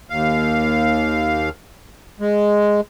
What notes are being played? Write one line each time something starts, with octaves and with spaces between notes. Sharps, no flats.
D#2 F5
G#3